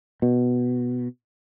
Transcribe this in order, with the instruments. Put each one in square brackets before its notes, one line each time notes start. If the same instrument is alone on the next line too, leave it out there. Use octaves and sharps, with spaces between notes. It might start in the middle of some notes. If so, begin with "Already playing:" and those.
[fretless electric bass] B2